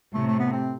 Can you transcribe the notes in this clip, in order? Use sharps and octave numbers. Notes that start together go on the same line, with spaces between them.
A2 C3 A3
A3
B3
C4